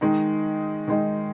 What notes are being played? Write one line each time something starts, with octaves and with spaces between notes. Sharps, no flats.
D#3 G#3 D#4
D#3 G#3 D#4